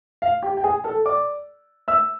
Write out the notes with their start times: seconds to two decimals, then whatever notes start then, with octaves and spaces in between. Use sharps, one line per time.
0.22 F5
0.43 G4 G5
0.57 G5
0.64 G#4 G#5
0.84 A4 A5
1.05 D5 D6
1.88 E5 E6